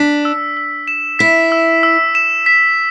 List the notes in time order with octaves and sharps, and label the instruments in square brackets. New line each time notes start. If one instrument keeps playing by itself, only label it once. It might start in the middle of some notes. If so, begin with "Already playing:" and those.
Already playing: [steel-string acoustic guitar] D4 [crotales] B6
[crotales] E6
E6
E7
[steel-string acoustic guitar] E4 [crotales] B6
[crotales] E6
E6
E7
B6